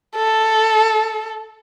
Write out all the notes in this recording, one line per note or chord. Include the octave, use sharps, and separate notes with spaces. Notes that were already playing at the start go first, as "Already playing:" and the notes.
A4